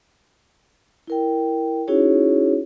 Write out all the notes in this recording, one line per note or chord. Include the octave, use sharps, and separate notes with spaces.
E4 A#4 G5
C#4 D#4 E4 F#4 G#4 C#5